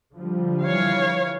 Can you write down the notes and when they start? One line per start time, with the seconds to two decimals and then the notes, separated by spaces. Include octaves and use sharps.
0.13 D3 F3 G3
0.64 E3 C#5 F5